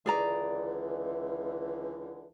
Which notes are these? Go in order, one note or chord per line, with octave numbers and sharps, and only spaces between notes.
C#2 D3 E3 G#4 D5 A#5